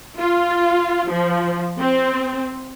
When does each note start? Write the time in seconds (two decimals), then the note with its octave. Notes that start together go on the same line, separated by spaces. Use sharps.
0.19 F4
1.12 F3
1.79 C4